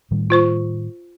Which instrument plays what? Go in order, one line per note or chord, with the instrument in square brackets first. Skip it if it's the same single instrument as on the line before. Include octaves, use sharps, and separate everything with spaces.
[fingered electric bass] A2 D#3 G3
[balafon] F4 C5 C#6